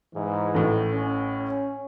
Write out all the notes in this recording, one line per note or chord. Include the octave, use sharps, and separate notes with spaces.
G#2 E3
A1 A2
C#4